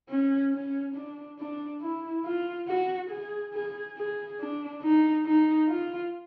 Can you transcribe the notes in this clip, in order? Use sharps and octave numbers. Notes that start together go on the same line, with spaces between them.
C#4
C#4
D4
D4
E4
F4
F#4
G#4
G#4
G#4
D4
D#4
D#4
F4